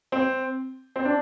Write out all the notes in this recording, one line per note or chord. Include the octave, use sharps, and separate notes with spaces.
C4
C4
D4